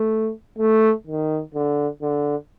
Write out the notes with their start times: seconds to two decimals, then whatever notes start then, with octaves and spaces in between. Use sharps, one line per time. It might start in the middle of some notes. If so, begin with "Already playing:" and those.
Already playing: A3
0.59 A3
1.07 D#3
1.55 D3
2.02 D3